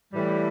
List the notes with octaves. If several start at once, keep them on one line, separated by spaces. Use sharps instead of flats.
A2 E3 G3